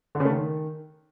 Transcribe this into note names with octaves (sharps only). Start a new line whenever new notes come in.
D3
C#3
A3
D#3